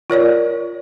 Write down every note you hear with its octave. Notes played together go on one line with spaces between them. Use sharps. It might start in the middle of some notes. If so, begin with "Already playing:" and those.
F4 A#4 C#5 D5